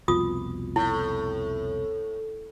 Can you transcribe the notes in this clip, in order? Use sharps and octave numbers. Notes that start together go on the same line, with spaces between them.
C2 F2 B2 F4 D#6
A2 E4